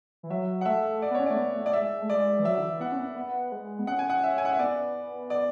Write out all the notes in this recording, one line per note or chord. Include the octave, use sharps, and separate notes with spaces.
E3
F#3 E5
F#5
A3 E5
D5
B3
C#5
C#4
A3 D5
B3
A3
D5
G#3 E5
A3
G#3 D5
E3
F#3 E5
D3
E3
B3 F#5
C#4
B3
B3
G#3
B3
C#4 F#5
G#5
F#5
E5
G#5
F#5
E5
B3 D5
D5